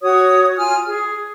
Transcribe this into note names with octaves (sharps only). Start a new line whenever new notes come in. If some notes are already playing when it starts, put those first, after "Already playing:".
F#4 C#5 D#6
F4 G#5 F6
G#4